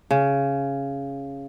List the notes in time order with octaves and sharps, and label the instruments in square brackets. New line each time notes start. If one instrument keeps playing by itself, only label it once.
[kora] C#3